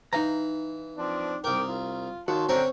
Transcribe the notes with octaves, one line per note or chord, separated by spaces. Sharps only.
E3 D#4 F5 A#5
F3 C4 D4
C2 A#4 G5 D6
F4
D#2 F#4 C#5 A5 C6
D3 C4 C#4 G5 A#5